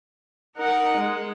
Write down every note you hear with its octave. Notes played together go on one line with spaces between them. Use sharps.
D#4 A#4 F#5
G#3